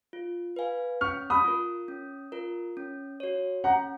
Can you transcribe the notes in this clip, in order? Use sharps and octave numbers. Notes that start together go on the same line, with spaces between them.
F4
B4 F5 G#5
C#4 C#6 F6
B5 D#6
F4 A#4
C#4
F4 A#4
C#4
F#4 C#5
C#4 F#5 A#5